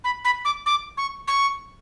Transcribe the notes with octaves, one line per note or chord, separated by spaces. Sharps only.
B5
B5
D6
D6
C#6
C#6